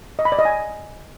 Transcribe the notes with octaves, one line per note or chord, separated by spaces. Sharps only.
D#5
B5
D5
D#5
G#5